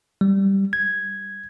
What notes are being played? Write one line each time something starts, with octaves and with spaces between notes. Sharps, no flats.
G3
G#6